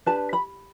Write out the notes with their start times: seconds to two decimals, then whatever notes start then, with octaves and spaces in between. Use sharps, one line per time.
0.06 D4 G4 B4 A5
0.33 B5